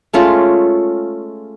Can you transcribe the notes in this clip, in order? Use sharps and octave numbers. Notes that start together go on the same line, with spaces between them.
G#3 A3 C#4 F4